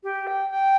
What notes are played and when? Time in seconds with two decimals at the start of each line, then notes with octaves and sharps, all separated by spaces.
0.03 G4
0.27 G5
0.50 G5